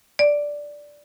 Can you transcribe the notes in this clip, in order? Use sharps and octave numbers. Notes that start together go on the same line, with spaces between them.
D5